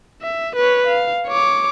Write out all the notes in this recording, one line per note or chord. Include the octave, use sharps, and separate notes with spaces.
E5
B4 C#5
F5
C#5 D6